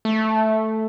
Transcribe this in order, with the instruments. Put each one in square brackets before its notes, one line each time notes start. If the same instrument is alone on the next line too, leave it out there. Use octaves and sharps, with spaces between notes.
[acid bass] A3